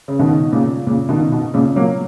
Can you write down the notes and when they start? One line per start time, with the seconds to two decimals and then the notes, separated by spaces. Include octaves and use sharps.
0.08 C#3
0.19 B2 D#3
0.53 A#2 C#3
0.87 A#2 C#3
1.09 B2 D#3
1.32 B2
1.54 A#2 C#3
1.76 F#3 A#3